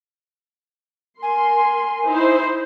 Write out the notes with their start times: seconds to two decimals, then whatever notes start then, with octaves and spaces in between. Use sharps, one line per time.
1.21 A#4 G#5 C6
2.07 D#4 E4 C5